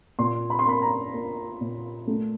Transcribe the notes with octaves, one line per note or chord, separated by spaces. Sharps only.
A#2 C6
B5
C6
A#3 B5
A#5
A#3
A#2
A3